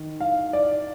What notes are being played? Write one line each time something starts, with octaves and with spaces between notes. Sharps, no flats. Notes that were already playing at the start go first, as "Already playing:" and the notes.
Already playing: D#3
F5
D5